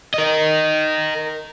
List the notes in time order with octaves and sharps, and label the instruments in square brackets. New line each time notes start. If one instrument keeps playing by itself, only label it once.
[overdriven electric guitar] A#4 D#5